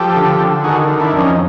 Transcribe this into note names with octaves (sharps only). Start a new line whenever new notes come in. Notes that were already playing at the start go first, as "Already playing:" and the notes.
Already playing: F3 G4 A4
D3
D3
D#3 F#4 G#4
D#3
D4 E4
F2
C#4 D#4